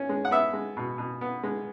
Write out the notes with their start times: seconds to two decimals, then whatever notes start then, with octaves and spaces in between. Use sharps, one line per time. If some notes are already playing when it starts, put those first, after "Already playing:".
Already playing: C#4
0.09 G#3
0.25 F#5
0.31 B3 E5
0.53 G#3
0.77 B2
0.98 B2
1.21 B3
1.43 G#3